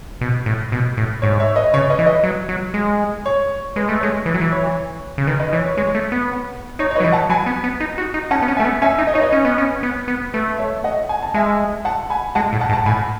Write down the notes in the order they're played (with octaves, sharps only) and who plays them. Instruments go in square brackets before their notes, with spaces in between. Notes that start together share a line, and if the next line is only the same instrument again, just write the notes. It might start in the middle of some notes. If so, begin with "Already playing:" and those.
[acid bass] B2
A2
B2
A2
[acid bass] G#2 [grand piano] C#5
[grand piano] C#5 E5
B4 D#5
[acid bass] C#3 [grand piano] C#5
[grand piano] B4 D#5
[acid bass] E3
[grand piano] B4 D#5
[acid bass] F#3
F#3
G#3
[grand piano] C#5
[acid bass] G#3 [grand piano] B4
[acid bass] A3
[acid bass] G#3 [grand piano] C#5
[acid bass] E3 [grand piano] B4
[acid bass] F#3
E3
[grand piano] C#5
[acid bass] C#3
[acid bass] D#3 [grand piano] B4
[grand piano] B4 D#5
[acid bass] E3 [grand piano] C#5
[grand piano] C#5
[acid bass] G#3 [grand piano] C#5
[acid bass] A3
B3
[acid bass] D#4 [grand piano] C#5
[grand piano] C#5
B4 D#5
[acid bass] F#3
E3
[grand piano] F#5 A5
[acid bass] F#3 [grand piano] G#5 B5
[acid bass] B3
B3
D#4
F#4
D#4
[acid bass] C#4 [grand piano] F#5 A5
[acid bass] B3
C#4
[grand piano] E5 G#5
[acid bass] A3
B3
[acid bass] C#4 [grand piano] E5 G#5
[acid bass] D#4
[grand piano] D#5
[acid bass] D#4 [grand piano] C#5
[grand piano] B4 D#5
[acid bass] C#4
B3
C#4
B3
B3
[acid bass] A3 [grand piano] B4
[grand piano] C#5 E5
D#5 F#5
G#5
A5
[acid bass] G#3 [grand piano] E5 G#5
[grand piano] F#5 A5
G#5 B5
[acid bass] G#3 [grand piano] F#5 A5
[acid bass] A2
[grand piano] F#5 A5
[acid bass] G#2
[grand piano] F#5 A5
[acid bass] A2 [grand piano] G#5 B5